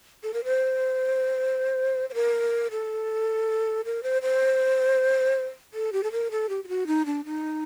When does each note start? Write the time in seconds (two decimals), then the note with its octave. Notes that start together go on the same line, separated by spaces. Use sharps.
0.23 A4
0.34 A#4
0.44 C5
2.10 C5
2.14 A#4
2.71 A4
3.85 A#4
4.03 C5
4.22 C5
5.74 A4
5.93 G4
6.03 A4
6.12 A#4
6.31 A4
6.49 G4
6.64 G4
6.68 F#4
6.87 D#4
7.06 D4
7.26 D#4